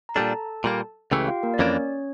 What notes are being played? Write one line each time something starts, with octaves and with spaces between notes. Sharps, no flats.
A#5
A#2 G3 D4 A4 A5
A#2 G3 A#3
C#2 C#3 E3 A3 G4 G5
F4 F5
A#3 A#4
D5
F2 E3 A#3 C#4 D4 C#5